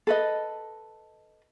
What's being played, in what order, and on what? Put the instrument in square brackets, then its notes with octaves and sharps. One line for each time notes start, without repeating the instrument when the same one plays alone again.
[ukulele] A4 B4 D#5